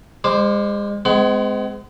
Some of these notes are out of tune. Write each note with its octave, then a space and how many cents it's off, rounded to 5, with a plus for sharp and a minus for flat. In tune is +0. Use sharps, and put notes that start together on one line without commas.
G#3 -35 C5 +0 D6 +10
G#3 +10 C4 -35 F#5 +35